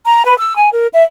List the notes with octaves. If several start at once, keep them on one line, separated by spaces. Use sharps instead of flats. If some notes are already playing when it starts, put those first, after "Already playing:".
A#5
B4
E6
G#5
A#4
E5